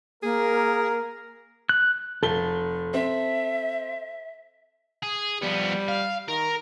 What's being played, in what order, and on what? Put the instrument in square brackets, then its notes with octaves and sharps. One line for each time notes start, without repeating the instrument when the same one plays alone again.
[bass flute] A#3 [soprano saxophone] G#4 [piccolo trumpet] A#4
[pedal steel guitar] F#6
[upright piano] F1 G7 [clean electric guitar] A4
[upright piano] C4 [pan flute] E5
[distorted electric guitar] G#4
[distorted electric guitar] F3 B3 [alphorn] G3
[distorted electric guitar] F5
[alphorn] D#3 [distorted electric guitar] A#4